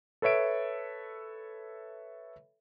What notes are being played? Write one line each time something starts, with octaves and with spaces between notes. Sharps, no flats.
A4 B4 C#5 E5 D7